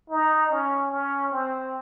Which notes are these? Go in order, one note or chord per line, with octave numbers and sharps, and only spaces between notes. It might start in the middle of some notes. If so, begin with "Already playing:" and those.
D#4
C#4
C#4
C4